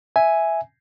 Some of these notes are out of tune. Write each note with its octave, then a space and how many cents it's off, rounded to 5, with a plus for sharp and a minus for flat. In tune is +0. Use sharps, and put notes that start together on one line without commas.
E5 +0 G#5 +0